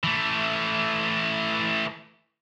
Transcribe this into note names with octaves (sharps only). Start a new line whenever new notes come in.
E3 A3